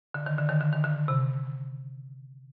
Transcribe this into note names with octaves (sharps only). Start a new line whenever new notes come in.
D3
D#3
D3
D#3
D3
D#3
D3
C3